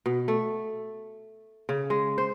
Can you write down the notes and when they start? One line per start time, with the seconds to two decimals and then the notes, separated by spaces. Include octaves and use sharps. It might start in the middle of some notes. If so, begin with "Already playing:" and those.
0.06 B2
0.28 A3
1.69 C#3
1.90 G#3
2.18 C5